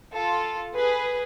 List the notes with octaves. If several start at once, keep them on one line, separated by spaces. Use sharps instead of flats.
F4 A4
G#4 B4